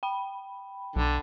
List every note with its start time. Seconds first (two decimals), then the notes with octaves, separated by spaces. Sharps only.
0.03 G5 B5
0.96 B1 D3